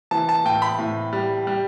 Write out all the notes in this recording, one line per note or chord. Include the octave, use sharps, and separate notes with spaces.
E3 A5
A5
A2 G5
B5
A2
G3
G3